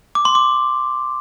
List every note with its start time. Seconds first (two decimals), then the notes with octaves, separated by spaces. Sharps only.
0.15 D6
0.25 C6
0.35 D6